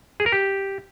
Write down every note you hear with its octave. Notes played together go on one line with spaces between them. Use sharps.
G#4
A#4
G4